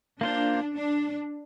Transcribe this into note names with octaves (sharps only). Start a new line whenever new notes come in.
A#3 D4 F4 C5
D4